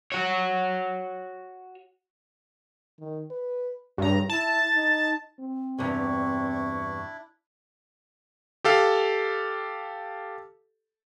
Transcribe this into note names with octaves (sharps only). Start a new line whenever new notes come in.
F#4 C#5
D#3
B4
G2 C#3 A#5
E4 A5
D#4
C4
E2 G2 C3 D4 E4 C#6
G4 A4 F5